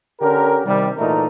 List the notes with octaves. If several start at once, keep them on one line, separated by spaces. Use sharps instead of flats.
D3 C#4 G4 A#4
C3 D#3 G3
A#2 E3 A3 D#4 A#4